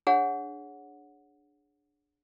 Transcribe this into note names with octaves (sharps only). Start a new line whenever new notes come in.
D4 G#4 C#5 F#5